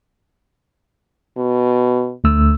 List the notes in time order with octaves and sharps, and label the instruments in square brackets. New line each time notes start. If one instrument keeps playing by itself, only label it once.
[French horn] B2
[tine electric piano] D2 A3 E6